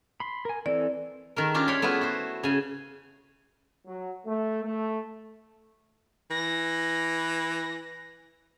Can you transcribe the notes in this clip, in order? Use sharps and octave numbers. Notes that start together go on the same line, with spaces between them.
B5 C6
A#4 G#5
E3 C4 A4 D5
D#3 A3 A#4
C#4 D4 F4 G4
C#5 D5 G5 B5 C6
A3 B3 E4 F4 B4
F#4 C5
C#3 G#5
F#3
A3
A3
E3 A#6